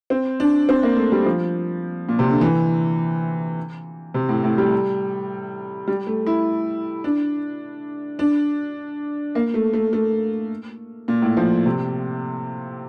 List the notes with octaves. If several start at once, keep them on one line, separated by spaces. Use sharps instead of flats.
C4
D4
C4
A#3
A3
G3
F3
A#2
C3
D3
E3
C3
A2
A2
G3
G3
A3
E4
D4
D4
A#3
A3
A3
A3
A#2
A2
F3
C3